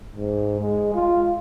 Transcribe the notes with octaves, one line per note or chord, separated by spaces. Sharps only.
G#2
G#3
F4